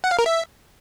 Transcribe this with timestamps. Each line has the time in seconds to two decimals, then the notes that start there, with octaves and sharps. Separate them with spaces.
0.04 F#5
0.11 F5
0.19 A#4
0.26 E5